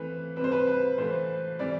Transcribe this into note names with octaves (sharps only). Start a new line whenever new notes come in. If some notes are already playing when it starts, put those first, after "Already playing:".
Already playing: E3 A3 C4 B4
C3 G3 C4 B4 C5
B4
B4
A2 E3 A3 C5
C3 E3 G3 D5